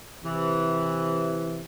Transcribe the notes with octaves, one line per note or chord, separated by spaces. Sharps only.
C3 E3